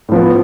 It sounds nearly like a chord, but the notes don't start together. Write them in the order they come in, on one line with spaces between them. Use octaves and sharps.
A2 F3 B3